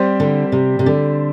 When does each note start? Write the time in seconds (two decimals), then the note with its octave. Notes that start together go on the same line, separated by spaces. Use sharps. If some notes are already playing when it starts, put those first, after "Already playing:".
Already playing: G3 C4 G4 C5
0.20 D3
0.52 C3
0.79 C3
0.86 D3